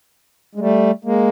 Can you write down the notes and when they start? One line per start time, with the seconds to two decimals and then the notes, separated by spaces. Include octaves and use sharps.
0.55 G#3
0.59 G3 A3
1.04 G#3 A#3